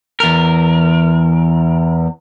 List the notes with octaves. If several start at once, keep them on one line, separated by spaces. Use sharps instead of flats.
E2 A#4